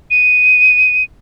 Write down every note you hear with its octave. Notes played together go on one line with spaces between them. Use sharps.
D#7